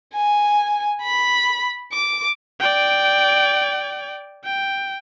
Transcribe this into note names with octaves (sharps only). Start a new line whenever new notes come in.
G#5
B5
D6
D5 G5
G5